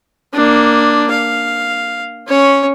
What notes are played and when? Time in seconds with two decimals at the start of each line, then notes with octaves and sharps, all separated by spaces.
0.34 A#3 D4
1.11 F5
2.27 C#4 C#5